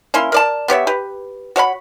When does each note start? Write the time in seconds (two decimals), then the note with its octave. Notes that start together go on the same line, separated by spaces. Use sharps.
0.14 A#3 C#4 E4 C6
0.32 A#4 D5 A5
0.68 B3 G4 C#5 E5
0.87 G4 B4
1.56 F#4 C#5 F5 B5